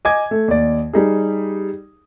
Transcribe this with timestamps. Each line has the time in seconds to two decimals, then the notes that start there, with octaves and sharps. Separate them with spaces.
0.05 D#5 G#5 D6 G#6
0.31 A3
0.48 D#2 D5
0.94 G3 D#4 G#4